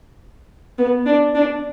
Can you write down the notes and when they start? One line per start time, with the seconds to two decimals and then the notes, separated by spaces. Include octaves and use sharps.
0.78 B3
1.06 D4
1.35 D4